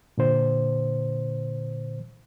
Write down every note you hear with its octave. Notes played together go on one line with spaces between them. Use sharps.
A#2 D3 C5